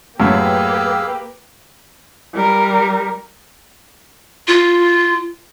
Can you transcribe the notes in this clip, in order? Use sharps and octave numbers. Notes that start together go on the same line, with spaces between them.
F#2 A2 A#3 G4 G#4 B4 F5 E6
G3 A#4
F4